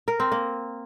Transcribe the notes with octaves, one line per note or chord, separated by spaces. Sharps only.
A#4
C4
A#3